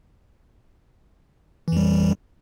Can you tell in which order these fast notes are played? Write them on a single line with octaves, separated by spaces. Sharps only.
E3 F2 G3